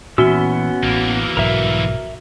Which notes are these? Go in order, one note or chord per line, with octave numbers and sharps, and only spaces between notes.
A#2 E3 B3 C#4 F#4 E6 G7
A1 E3 A#3
B1 G#2 F#3 A#4 E5